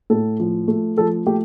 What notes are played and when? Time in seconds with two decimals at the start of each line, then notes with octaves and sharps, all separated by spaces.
0.10 A2 A4
0.40 F3
0.68 A3
0.97 F3 A4
1.26 A3 G4